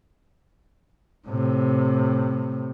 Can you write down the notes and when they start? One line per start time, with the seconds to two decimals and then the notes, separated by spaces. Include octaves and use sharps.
1.28 A2 C3